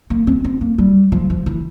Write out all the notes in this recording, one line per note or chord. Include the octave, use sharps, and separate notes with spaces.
A#3
C4
C4
A#3
G3
F3
F3
E3